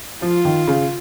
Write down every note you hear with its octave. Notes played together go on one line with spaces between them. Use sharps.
F3 F4
D#3
C#3